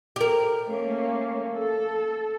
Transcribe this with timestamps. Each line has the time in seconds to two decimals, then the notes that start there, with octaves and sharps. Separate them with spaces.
0.16 G4 A#4
0.65 A3 A#3 C#4
1.55 A4